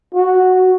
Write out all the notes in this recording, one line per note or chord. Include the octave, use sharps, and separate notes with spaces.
F#4